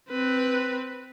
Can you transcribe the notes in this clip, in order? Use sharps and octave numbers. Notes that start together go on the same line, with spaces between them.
C4 B4